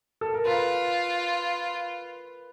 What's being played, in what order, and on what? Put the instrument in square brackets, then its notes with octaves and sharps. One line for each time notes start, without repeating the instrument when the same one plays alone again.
[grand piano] A4
A#4
[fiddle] F4 [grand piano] B4